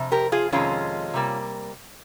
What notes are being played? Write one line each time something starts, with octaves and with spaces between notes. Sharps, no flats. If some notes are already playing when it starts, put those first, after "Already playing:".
Already playing: F2 C3
G4 A#4
F4 G#4
F2 C3 D#3 G#3 C#4 F4
C3 G3 A#3